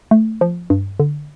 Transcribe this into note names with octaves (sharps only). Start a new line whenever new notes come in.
A3
F3
G2
D3